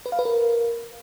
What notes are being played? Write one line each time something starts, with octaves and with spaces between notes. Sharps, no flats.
B4
F5
B4
A#4